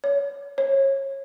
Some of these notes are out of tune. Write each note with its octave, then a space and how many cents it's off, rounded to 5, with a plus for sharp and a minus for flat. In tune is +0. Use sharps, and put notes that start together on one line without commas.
C#5 +25
C#5 -30